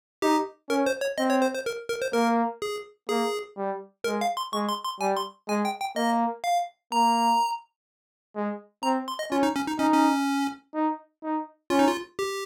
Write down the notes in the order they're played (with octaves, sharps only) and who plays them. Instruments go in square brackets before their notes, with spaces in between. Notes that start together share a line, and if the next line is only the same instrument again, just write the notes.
[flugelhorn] D#4 [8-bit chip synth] G4
[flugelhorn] C#4 [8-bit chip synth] A#4
[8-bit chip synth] C5
C#5
[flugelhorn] C4 [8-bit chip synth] D#5
[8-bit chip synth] C#5
C5
C5
A#4
A#4
C5
[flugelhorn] A#3 [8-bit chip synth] A#4
[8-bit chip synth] G#4
[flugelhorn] A#3 [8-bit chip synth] G#4
[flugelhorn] G3
[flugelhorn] G#3 [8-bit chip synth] A#4
[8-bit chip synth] F5
C6
[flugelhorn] G#3 [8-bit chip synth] C#6
[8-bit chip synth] C6
C6
[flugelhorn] G3 [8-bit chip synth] G#5
[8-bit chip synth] C6
[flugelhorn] G#3 [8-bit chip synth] G#5
[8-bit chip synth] G5
G5
[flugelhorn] A#3 [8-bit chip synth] D#5
[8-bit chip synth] F5
[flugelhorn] A#3 [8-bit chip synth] A#5
[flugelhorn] G#3
[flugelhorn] C4 [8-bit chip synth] A#5
[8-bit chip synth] C6
D#5
[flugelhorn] C#4 [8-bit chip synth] F4
[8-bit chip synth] D#4
C#4
D#4
[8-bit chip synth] C#4 [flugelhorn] D#4
[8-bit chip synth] C#4
[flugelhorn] D#4
D#4
[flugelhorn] C#4 [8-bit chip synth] F4
[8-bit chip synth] D#4
F4
G4